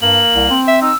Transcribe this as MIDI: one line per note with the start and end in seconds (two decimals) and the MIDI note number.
0.02 0.22 43
0.02 0.55 58
0.02 0.59 102
0.34 0.48 36
0.50 0.91 60
0.68 0.82 76
0.82 0.92 63
0.82 0.96 88